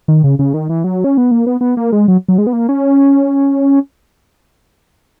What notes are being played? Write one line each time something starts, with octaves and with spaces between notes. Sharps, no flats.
D#3
C#3
C#3
D#3
E3
F#3
C#4
B3
A#3
B3
B3
A#3
G#3
F#3
F#3
G#3
B3
A#3
C#4